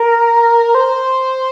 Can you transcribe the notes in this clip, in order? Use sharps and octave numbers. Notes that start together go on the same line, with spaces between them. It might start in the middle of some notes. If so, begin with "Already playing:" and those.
Already playing: A#4
C5